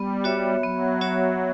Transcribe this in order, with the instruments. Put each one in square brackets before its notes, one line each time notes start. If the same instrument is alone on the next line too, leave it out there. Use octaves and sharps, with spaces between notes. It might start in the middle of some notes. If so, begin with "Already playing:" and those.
Already playing: [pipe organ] G3 [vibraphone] B3
[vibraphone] F#4 C#5 E5
[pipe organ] F#3 [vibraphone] B3
[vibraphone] F#4 C#5 E5